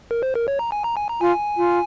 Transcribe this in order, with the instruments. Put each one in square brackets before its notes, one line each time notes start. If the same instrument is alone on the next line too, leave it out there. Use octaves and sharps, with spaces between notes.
[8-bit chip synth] A#4
C5
A#4
C#5
A#5
G#5
A#5
G#5
A#5
[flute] F4 [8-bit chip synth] G#5
[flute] F4